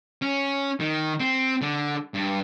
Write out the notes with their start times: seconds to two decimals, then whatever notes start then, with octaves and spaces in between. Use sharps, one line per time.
0.22 C#4
0.80 D#3
1.20 C4
1.62 D3
2.14 G2